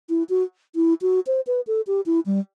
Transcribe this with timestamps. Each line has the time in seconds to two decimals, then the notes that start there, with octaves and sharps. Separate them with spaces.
0.09 E4
0.29 F#4
0.75 E4
1.02 F#4
1.27 C5
1.47 B4
1.67 A4
1.87 G4
2.06 E4
2.26 G3